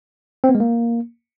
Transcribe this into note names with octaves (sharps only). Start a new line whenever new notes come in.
C4
B3
G#3
A#3